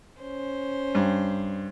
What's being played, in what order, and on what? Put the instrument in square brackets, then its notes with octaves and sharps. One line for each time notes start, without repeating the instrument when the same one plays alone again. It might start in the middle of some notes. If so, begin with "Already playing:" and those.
[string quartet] C#4 C5
[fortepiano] G2